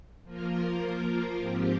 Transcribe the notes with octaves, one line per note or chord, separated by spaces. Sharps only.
F3 A#3 F4 A#4
G#2 F3 C4 G4